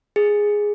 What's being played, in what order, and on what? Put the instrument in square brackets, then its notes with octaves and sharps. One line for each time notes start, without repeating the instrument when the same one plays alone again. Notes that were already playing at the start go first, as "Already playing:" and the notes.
[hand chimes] G#4